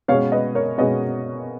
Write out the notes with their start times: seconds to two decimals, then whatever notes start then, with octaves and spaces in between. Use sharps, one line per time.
0.08 B2 G#3 C#4 C#5 F5
0.32 B4 D#5
0.55 A#4 C#5
0.78 B2 G#3 C#4 B4 D#5